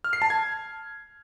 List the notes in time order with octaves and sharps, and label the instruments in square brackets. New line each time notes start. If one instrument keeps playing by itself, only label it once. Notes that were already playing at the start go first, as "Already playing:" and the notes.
[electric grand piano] F6
C7
A5
G#6